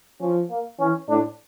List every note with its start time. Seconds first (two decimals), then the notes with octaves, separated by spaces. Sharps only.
0.20 F3 C#4
0.50 A#3
0.79 E3 C#4
1.08 A2 D4